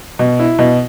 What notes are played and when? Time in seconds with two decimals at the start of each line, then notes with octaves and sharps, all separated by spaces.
0.19 B2
0.39 E4
0.59 B2